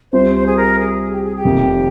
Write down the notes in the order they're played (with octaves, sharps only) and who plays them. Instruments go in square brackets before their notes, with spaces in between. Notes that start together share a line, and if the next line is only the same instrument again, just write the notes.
[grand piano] C2 C3 G3 C4 F4 [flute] C5
[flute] C5
G#4
A#4
G#4
G4
G#4
G4
[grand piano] F1 F2 C3 D#3 A#3